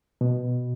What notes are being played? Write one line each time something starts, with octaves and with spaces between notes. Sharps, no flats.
B2